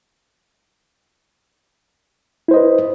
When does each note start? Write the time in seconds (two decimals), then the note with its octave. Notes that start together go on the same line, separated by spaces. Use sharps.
2.48 E4
2.51 C5
2.54 D#5
2.56 B4